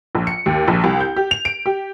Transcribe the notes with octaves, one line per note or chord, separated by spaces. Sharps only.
A#1
C#7
D#2
A#1
C2
G6
G4
F7
D7
G4